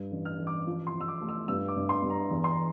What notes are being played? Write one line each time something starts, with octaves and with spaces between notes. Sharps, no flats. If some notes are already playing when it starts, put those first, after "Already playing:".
Already playing: G2
A1
F6
A1
D6
F3
C6
F3
E6
D6
A3
E6
G2 E6
D6
G2
C6
G2
A#5
E2
C6
A#5